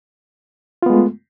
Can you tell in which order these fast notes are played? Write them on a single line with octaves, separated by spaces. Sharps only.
F4 B3 G#3 A3